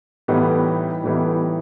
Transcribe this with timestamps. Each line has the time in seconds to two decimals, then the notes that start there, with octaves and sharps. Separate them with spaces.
0.28 A2 E3 G3 B3 D#4
1.04 A2 E3 G3 B3 D#4